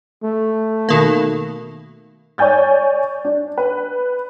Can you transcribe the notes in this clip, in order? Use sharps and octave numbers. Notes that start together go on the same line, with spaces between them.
A3
B2 D#3 A#3
C#5 D5 G#5 G6 A6
D4
B4